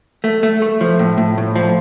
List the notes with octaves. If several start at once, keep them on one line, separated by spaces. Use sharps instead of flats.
A3
A3
A3
F3
A2
A2
A2
F3